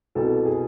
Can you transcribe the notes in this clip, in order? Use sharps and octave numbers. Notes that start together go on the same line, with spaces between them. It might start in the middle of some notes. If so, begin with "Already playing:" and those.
C2 B2 B3 A4
G#4